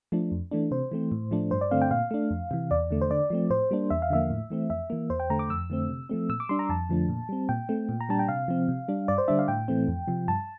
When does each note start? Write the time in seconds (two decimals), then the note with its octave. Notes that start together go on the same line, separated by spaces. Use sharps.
0.12 F3 A3 D4
0.32 F2
0.51 E3 A3 D4
0.71 C3 C5
0.92 E3 A3 C4
1.12 A2
1.31 F3 A3 D4
1.51 G2 C5
1.61 D5
1.71 D3 A3 C4 F5
1.82 G5
1.91 A#2 F5
2.11 A3 D4
2.31 F2
2.51 C3 E3
2.71 E2 D5
2.91 D3 A3
3.01 C5
3.11 D3 D5
3.30 F3 A3 C4
3.50 A2 C5
3.71 G3 A#3 D4
3.90 E2 E5
4.02 F5
4.10 D3 F3 A#3 E5
4.30 A2
4.50 E3 A3 C4
4.70 F2 E5
4.90 E3 A#3
5.10 E2 C5
5.20 G5
5.30 D3 A3 A#5
5.39 D6
5.50 F2 E6
5.70 D3 A3 C4
5.90 C3
6.09 F3 A3 C4
6.29 A#2 E6
6.40 D6
6.49 G3 D4 C6
6.59 A#5
6.69 F2 A5
6.89 D3 F3 A3 D4
7.09 A#2
7.29 G3 C4
7.49 A#2 G5
7.69 A3 C4
7.89 A#2
8.01 A#5
8.09 G3 D4 A5
8.19 G5
8.28 C3 F5
8.48 F3 C4
8.68 C3
8.88 G3 D4
9.08 G2 D5
9.18 C5
9.28 D3 G3 D4 E5
9.39 F5
9.48 A2 G5
9.68 E3 A3 C4
9.88 F2
10.07 C3 F3
10.28 G2 A5